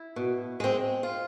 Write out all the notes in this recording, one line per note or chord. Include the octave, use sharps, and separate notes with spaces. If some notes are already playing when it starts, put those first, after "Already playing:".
Already playing: E4
B2
G#3 C4
F4